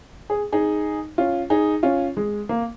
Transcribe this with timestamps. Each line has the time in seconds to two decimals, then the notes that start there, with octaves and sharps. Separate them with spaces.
0.30 G#4
0.53 D#4 G#4
1.18 C#4 F4
1.50 D#4 G#4
1.83 C#4 F4
2.17 G#3
2.49 A#3